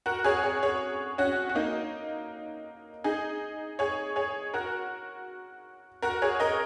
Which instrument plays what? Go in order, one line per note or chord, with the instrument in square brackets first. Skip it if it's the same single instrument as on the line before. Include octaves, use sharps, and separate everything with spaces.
[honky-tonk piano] F#4 A#4
G#4 C#5
G#4 C#5
G#4 C#5
C#4 F#4
F#4
A#3 D#4
D#4 G#4
G#4 C#5
G#4 C#5
F#4 A#4
F#4 A#4
G#4 C#5
A#4 D#5